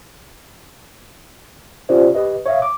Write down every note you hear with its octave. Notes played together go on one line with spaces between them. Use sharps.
C#4 F4 G4 C5 D5
G4 B4 D#5
C#5 E5 F5
D6